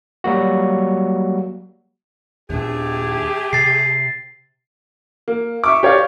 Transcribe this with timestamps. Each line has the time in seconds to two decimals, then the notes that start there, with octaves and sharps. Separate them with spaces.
0.24 F#3 G3 A#3 F#4
2.50 D#2 A#2 A3 D4 G4 G#4
3.53 C3 A6 C7
5.28 A#3
5.64 E5 C#6 D6
5.83 G4 C#5 D5 F5